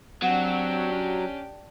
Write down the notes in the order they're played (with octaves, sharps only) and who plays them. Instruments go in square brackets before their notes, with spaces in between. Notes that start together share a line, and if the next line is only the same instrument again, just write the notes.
[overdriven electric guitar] F#3 [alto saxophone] C4 [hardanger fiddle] D4 G4 [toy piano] F#5
[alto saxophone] C#4